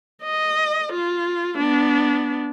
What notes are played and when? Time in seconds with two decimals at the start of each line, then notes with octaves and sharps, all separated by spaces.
0.23 D#5
0.93 F4
1.57 B3 D4